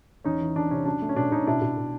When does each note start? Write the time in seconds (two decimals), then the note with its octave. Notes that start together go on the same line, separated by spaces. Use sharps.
0.24 E2 C#4 D#4
0.41 E3
0.55 E2 D4
0.71 C3 C#4
0.85 F#3 D4
1.02 A3
1.09 C#4
1.16 B2 D4
1.31 B2 C#4 D#4
1.47 B2 D4 E4
1.62 B2
1.77 B2